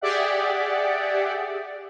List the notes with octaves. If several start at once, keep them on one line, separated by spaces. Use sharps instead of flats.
G4 G#4 D5 E5 F#5